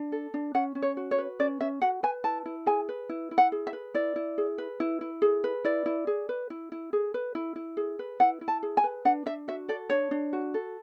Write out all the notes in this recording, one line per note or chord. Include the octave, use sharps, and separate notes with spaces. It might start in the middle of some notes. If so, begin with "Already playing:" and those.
Already playing: D4
A4
D4
C#4 F#5
C#4
C#5
F#4
C#5
B4
C#4 D5
C#4 E5
F#4 F#5
B4 G#5
E4 A5
E4
G#4 G#5
B4
E4
E4
F#5
G#4
E5
B4
E4 D5
E4
G#4
B4
E4
E4
G#4
B4
E4 D5
E4
G#4
B4
E4
E4
G#4
B4
E4
E4
G#4
B4
E4 F#5
E4
A5
G#4
G#5
B4
D4 F#5
D4 E5
F#4 E5
A4 D5
D4 C#5
D4
F#4
A4